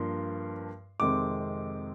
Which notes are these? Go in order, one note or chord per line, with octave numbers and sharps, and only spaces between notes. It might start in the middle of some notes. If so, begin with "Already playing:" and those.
Already playing: G2 F3 A#3 D4 C6
F2 C3 D#3 G#3 C4 D6